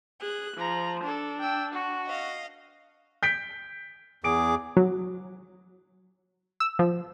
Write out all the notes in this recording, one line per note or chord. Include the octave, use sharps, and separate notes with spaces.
G#4 F#6
F3 A#5
D4 A4
G5 E6
F#4
D#5 F5
G6 B6 D7
E2 G#4 D6 D7
F#3
E6
F3